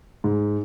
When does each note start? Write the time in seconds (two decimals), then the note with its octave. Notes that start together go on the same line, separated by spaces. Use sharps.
0.24 G#2